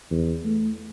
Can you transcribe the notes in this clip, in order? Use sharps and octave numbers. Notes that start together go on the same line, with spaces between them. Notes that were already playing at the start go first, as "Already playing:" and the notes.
E2
A3